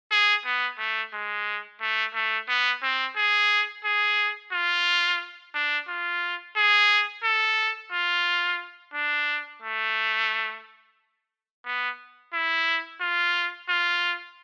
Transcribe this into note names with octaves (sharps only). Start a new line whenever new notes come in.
G#4
B3
A3
G#3
A3
A3
B3
C4
G#4
G#4
F4
D4
F4
G#4
A4
F4
D4
A3
B3
E4
F4
F4